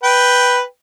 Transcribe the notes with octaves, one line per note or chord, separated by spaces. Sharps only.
B4 G5